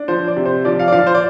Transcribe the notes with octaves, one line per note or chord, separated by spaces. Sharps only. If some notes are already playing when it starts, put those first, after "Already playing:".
Already playing: D4
F3 C5
D5
C3
C5
F3 D5
F5
D5
F3 F5
C5
D5